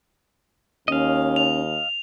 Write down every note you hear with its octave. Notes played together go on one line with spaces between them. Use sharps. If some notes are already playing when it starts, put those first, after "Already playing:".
D#2 C#4 D#5 F5
F7